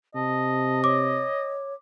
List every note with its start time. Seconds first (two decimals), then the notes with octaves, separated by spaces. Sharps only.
0.15 C3 D#5 A5
0.84 C#5 D6